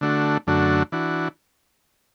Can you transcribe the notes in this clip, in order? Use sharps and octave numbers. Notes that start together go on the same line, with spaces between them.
D3 A3 D4 F#4
F#2 D3 A3 D4 F#4
E3 D4 F#4